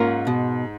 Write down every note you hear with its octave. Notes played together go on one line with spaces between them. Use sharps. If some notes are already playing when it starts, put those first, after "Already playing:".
Already playing: G#2 A#3 C#4 F4 A#4
B2